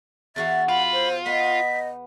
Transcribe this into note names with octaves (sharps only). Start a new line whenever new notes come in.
E2 F#4 E5 F5 A6
F4 F#5 G5 B5
C5
B3 D#5 B6